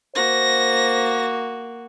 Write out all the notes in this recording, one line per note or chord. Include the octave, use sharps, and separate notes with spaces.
A#3 F#4 C5 A#6